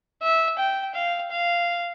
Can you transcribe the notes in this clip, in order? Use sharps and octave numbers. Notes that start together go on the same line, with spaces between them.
E5
G5
F5
F5